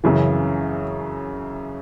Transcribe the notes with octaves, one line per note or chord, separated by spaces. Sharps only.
F#2 C#3 E3